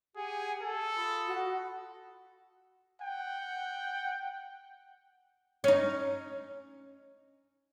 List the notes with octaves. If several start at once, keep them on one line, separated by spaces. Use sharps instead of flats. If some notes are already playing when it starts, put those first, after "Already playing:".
G4 G#4 F#5 G#5
A4
F4 B5 D#6
F#4
F#5 G5
C#4 D#4